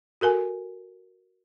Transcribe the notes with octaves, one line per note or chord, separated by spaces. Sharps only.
F#4 A4 A#4 G#5